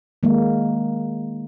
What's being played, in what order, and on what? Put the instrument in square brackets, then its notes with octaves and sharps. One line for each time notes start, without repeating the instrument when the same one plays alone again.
[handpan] D#3 G#3 A#3